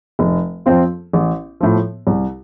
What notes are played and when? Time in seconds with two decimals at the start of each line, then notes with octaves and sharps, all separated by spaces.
0.19 F1
0.66 F2 F3 C4 F4
1.13 A1
1.61 A2 F3
2.07 C2